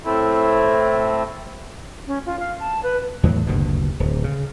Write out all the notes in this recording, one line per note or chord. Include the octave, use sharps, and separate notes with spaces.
A2 A3 C4 E4
C#4
F4
F5
A5
B4
E2 A2 D#3 F#3
F#1 D2 G2 B2
D1
C#3